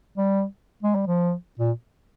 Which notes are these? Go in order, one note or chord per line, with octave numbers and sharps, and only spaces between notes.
G3
G#3
G3
F3
A#2